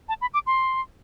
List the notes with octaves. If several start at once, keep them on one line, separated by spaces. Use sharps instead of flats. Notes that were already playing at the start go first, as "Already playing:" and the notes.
A5
B5
D6
C6